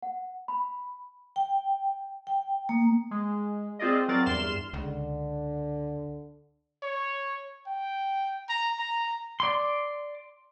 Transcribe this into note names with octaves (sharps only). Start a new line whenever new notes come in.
F#5
B5
G5
G5
A#3
G#3
C4 F4 G#4 D5 D#5
F#3 C4 F4 A#4 D5 A6
E2 G2 C6 F6 C7 E7
C#2 D3
C#5
G5
A#5
A#5
D5 C6